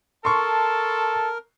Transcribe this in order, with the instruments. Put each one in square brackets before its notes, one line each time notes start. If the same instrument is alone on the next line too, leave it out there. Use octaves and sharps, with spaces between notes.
[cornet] A4 [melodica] A#4 [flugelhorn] A5 [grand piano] C6 C#6